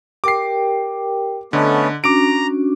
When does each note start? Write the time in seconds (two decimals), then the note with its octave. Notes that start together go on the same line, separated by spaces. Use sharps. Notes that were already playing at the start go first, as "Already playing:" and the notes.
0.24 G4 A#4 G5 D6 C7
1.53 D3 A3 B3 C#4 A4 D#5
2.04 C#4 D4 F#4 A#5 D6 D7